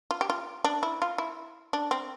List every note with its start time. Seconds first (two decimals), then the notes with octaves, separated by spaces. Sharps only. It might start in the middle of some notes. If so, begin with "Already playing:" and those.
0.11 F4
0.21 G4
0.30 F4
0.64 D4
0.83 E4
1.02 F4
1.18 E4
1.73 D4
1.91 C4